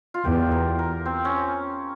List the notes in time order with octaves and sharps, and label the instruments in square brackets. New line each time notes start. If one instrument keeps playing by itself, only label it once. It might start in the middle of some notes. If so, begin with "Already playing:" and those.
[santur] F4
[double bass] E2 [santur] G4
[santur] A#4
A#4
C4
C#4